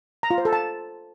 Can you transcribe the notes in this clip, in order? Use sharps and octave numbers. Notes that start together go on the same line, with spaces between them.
A#5
F4
C5
A4
A5